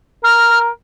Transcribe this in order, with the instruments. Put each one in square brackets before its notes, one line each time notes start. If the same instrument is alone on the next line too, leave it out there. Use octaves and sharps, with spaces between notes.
[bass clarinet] A#4 [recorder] F6